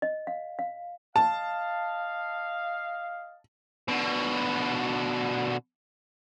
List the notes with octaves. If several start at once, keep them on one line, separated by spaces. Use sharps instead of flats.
D#5
F5
F5
D#5 F5 A5
B2 D3